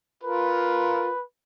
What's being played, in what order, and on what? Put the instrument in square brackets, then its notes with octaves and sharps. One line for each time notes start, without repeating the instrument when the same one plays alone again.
[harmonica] F4 A#4 [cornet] B4